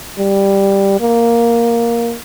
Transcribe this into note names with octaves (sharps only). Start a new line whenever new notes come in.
G3
A#3